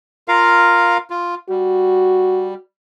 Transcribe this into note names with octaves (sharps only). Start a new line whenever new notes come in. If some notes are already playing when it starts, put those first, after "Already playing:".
F4 A#4 F5
F4
G3 F#4